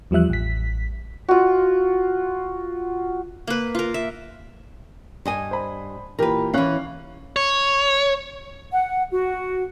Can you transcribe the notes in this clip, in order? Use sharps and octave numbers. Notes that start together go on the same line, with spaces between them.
E2 F3 G3 E5 F#6
A1 B6
F4 F#4
A#3 B4
F4 A#4
E5
G2 D#5 G#5
C5 B5
A#2 E3 G4 A#4 B4
E3 C#4 F5 F#6
C#5
F#5
F#4